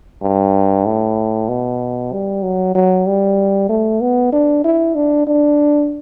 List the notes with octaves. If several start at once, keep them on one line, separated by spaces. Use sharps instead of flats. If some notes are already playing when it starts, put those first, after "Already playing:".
G2
A2
B2
G3
F#3
F#3
G3
A3
B3
D4
E4
D4
D4